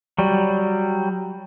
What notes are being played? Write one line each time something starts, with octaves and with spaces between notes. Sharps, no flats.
F#3 G3